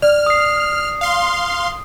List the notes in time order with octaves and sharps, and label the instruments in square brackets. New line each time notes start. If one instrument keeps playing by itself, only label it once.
[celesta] D5 [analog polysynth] F6
[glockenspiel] D#6 C7
[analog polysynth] F5 C6